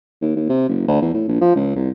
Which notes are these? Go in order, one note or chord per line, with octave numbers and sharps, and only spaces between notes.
D#2
D#2
C3
F#1
D2
E2
A2
A#1
F3
C#2
C2